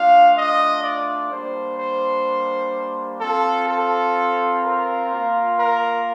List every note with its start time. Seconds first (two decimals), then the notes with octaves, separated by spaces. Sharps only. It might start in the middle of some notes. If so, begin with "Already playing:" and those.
Already playing: A3 D4 F4 F5
0.37 D#5
0.84 D5
1.31 G3 A#3 D4 C5
1.79 C5
3.21 C4 F4 A4
3.68 A4
4.64 A#4
5.11 A#3 F4
5.58 A#4